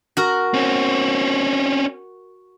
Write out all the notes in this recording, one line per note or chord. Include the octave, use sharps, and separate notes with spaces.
F#4 A#4
C4 C#4